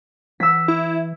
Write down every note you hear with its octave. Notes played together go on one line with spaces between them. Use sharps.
E3 E6 B6
E4